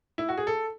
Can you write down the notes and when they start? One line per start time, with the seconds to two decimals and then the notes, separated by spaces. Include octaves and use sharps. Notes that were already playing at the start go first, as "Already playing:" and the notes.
0.18 E4
0.29 F#4
0.37 G#4
0.47 A4